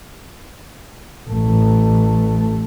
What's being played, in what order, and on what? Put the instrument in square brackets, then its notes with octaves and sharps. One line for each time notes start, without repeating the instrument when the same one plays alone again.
[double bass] A1 A3